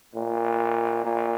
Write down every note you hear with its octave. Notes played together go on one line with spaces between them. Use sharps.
A#2
A#2